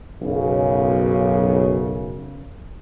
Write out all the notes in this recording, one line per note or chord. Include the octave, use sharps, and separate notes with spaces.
B1 F#2 C#3